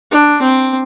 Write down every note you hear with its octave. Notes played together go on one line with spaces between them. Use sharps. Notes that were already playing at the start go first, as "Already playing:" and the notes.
D4
C4